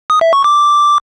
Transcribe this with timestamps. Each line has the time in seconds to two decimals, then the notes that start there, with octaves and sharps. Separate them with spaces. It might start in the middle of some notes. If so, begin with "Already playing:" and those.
0.10 D#6
0.21 E5
0.33 C#6
0.44 D6